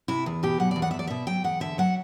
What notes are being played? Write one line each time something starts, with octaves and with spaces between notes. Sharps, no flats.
C3 E4
E2
B2 G4
F#3 F#5
E2 D5
F#5
E5
E2
D5
B2 E5
F#3 G5
E2 F#5
D3 E5
F#3 F#5